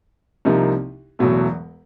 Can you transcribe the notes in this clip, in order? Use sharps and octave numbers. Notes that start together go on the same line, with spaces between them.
C2 C3 F3 A#3 D#4
E1 E2 B2 F#3 A3